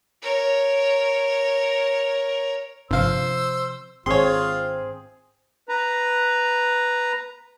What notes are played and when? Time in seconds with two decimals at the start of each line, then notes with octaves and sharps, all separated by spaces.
0.22 A#4 C#5
2.91 G1 C3 F3 C5 F5 E6
4.06 G#1 C4 F4 G#4 C#5 C6
5.69 B4 A#5